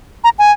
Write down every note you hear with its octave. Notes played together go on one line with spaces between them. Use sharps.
A#5
G#5